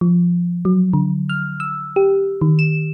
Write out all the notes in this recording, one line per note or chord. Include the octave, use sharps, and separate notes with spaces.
F3
F#3
D3
F6
E6
G4
D#3
E7